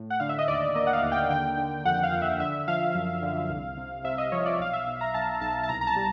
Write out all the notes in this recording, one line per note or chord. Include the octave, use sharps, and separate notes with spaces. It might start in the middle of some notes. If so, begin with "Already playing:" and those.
Already playing: A2
F#5
D3 F5
E5
D#5
D#2 D5
A#3 D#5
F#5
F5
D#2
G5
D3 G5
D3
F2 F#5
F5
F2
E5
D3 E5
F3 F5
F#2
D3
C2
C3
C3 E5
D#5
F3 C#5
D5
B1 F5
E5
B1
A#5
B1 A5
B1 A5
A5
C2 A#5
A#5
A5
G3